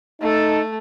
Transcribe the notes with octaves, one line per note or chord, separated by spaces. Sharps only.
A3 D#4 A4